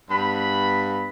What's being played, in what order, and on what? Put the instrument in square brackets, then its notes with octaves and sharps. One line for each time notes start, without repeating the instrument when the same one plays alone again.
[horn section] G2 B3 B5